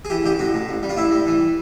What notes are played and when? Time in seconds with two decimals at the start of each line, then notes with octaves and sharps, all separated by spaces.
0.05 G#4
0.10 E3 G4
0.25 A1 G4
0.39 A2 F#4
0.54 A2
0.69 A1
0.83 G3
0.89 F4
0.97 A2 E4
1.11 G3
1.27 E3